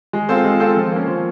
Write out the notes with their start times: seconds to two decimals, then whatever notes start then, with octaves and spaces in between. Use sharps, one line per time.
0.13 G#3
0.29 C4 F4 A4 C5
0.45 G#3
0.60 C4 F4 A4 C5
0.76 F3
0.91 A#3 C#4
1.07 F3